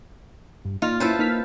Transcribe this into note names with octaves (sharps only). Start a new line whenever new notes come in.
G2
A#3 D#4 F4 F6
C#4 E4 A4 B4 C5
A#3 D#4 F6 B6